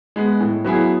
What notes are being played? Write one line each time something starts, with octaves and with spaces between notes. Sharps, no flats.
G#3 B3
A2
F#3 B3 E4 G#4